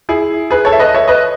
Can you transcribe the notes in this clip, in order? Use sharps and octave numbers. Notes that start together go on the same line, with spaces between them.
E4 G#4
G#4 B4
A4 C#5
E5
B4 D#5
C#5 E5
B4 D#5